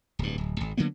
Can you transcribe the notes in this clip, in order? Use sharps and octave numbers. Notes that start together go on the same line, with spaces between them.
D1 G2
D1
G#1
D3 F#3 A#3 B3